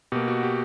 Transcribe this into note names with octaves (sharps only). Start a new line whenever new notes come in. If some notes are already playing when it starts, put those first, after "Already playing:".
B2 A#3 G4
F#4
G4